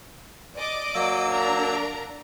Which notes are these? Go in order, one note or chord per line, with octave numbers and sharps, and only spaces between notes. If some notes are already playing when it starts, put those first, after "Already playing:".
D5 D#5 D6
F#3 A#3 E6
D4 A#4 A#5